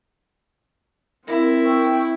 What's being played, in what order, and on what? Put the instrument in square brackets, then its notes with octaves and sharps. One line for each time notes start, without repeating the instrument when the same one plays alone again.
[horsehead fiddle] C4 [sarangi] E4 [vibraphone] A#4
[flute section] G5 C#6 E6